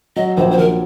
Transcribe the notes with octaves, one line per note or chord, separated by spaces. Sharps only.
F#3 D#5
A#1 C5
C5
A#1 A#4